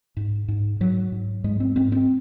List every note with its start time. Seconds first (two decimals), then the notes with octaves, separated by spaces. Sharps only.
0.17 G#2
0.48 G#2
0.80 G#2 F#3
1.12 G#2
1.44 G#2 G#3
1.60 C4
1.76 G#2 C4
1.92 C4